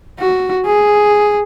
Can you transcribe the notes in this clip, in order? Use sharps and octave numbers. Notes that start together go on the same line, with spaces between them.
F#4
G#4